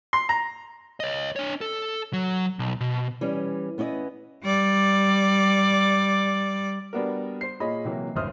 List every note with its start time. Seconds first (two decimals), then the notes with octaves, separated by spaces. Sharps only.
0.13 C6
0.29 A#5
1.00 C#5 D#5
1.36 D4 C#5
1.61 A4
2.13 F#3
2.59 B1
2.80 B2
3.21 E3 G3 C#4
3.78 B3 C#4 E4 D5 D#5
4.43 G3 D5
6.93 G3 B3 D4 F#4 A#4
7.41 C5 C7
7.60 A#2 F4 G#4 C#5 D#5 B5
7.85 C3 E3 F#3 A#3
8.15 D1 G1 F#2 C5 D#6 F6